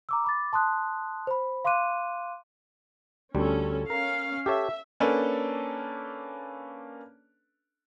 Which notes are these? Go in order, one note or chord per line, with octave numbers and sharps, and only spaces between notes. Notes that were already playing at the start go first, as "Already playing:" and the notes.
A#5 D6 E6
B5 D6 A6
A5 C6 D#6 F#6
C5 B5
F5 C6 D6 F#6 D#7
D2 G3 C#4 A4
C#4 A#4 F5
G4 A4 C#5 E5
A#3 C#4 D4 A4 B4